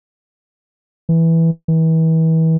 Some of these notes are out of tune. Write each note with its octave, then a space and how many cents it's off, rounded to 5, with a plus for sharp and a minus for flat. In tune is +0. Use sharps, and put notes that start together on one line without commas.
E3 -5
E3 -35